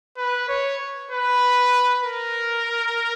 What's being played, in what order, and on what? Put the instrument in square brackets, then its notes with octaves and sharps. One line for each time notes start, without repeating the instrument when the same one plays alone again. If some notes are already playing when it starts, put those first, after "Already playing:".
[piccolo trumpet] B4
C#5
B4
A#4